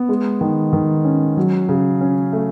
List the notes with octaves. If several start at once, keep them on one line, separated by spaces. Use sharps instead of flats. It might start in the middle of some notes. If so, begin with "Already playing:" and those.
Already playing: B3
G#3
D#3
D#3
C#4
F#3
C#3
C#4
A3